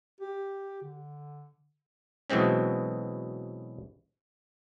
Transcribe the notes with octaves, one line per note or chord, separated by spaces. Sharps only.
G4
D3
B2 E3 F#3 G#3 C4 C#4